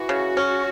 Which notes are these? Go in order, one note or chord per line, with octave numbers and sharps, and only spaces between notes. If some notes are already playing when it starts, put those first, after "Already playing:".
Already playing: E3 F#4
C#3
C#4